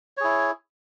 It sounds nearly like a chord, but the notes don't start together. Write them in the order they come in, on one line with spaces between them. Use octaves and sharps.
C#5 G#4 E4